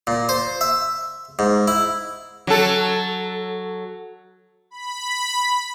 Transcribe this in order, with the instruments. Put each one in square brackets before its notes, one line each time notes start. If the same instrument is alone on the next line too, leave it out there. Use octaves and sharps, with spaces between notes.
[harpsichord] A#2
C5
E5
G#2
E4
[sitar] F#3 A4
[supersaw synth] B5